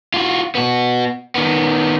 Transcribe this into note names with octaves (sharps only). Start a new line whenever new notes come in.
F4 F#4
B3 F#4
D#3 B3